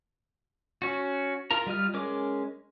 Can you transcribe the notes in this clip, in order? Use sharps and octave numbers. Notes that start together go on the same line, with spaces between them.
C#4 F#4
F4 A#4 A#5
G3 F4 D#5 F6
G#3 C#4 A#4 D6